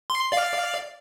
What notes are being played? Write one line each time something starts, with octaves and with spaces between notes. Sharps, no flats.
C6
D5 F5